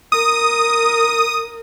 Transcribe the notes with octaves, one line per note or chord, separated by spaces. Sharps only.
A#4 D#6